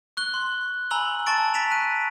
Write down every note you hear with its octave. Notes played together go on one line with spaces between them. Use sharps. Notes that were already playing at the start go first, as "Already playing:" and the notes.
C#6 F#6 G7
C6
G#5 A#5 B5 E6 F#7 G7
A5 B5 C#6 A6 D7
A5 B6 D7 E7 F7
F#6 D#7